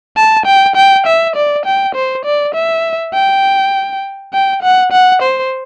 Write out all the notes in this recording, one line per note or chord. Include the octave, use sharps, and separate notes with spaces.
A5
G5
G5
E5
D5
G5
C5
D5
E5
G5
G5
F#5
F#5
C5